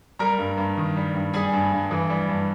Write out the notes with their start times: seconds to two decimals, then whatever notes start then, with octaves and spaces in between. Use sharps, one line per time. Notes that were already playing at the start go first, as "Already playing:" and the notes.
0.19 G3 A#4 A#5
0.39 G2
0.57 G2
0.77 D#3
0.96 G3
1.15 G2
1.34 G3 G#4 G#5
1.53 G2
1.72 G2
1.91 E3
2.10 G3
2.29 G2